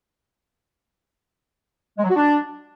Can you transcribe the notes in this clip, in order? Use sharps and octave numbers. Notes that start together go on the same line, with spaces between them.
G#3
F#3
F#4
D4